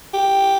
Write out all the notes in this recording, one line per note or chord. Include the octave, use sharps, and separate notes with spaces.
G4